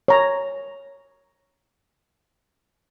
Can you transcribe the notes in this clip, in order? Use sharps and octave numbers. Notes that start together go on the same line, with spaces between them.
C#5 A#5